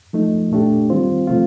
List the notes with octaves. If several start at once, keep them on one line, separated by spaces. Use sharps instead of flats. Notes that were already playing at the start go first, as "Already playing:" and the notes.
F3 A3 D#4
A#2 A3 D4 G4
D#3 G3 C4 F4 C5
C3 F3 A3 C4 F4